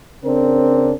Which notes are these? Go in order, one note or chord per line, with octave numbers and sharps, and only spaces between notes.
C#3 C4 D4 A#4